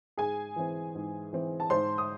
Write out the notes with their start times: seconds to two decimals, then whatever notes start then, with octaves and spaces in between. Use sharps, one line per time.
0.17 G#2 G#4 G#5
0.56 E3 C4
0.95 G#2
1.33 E3 C4
1.60 A5
1.70 G#2 C5 C6
1.98 D#6